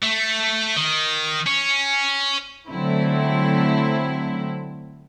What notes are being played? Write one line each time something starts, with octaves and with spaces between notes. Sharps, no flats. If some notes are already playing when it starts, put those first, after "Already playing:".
A3
D#3
C#4
D3 F#3 A3 C4 E4